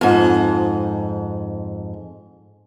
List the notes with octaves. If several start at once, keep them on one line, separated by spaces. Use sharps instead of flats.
F2 G#2